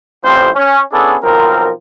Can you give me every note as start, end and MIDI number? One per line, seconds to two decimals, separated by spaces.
0.24 0.49 33
0.24 0.49 45
0.24 0.49 53
0.24 0.49 55
0.24 0.49 60
0.24 0.49 72
0.55 0.81 61
0.92 1.16 59
0.92 1.16 61
0.92 1.16 62
0.92 1.16 64
0.92 1.16 68
0.92 1.16 69
1.23 1.70 35
1.23 1.70 53
1.23 1.70 60
1.23 1.70 70